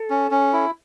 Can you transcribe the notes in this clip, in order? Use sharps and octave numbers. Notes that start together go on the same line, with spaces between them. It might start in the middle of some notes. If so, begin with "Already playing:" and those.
Already playing: A4
C#4
C#4
E4